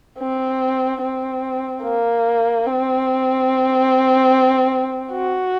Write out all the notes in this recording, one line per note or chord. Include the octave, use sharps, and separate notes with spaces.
C4
C4
A#3
C4
F#4